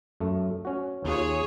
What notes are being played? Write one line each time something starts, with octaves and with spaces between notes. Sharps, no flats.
F#2 A3
C#4 F#4
D#2 F4 G#4 C#5